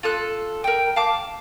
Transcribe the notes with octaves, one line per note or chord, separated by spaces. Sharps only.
F4 A4 F#6
A#4 G5
F5 A5 D6